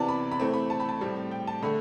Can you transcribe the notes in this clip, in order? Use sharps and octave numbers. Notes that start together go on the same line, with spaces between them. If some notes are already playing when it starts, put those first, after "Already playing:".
Already playing: C3 E3 B3 D5 A5
B5
B5
E3 A3 C4
B5
A5
B5
A5
A2 G3 C4
G5
A5
D3 A3 B5